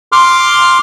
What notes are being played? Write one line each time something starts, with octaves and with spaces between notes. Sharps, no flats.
C6 D6 F6